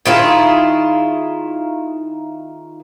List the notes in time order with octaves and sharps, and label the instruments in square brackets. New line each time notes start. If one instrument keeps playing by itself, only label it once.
[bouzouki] D#3 E4 F4 G#4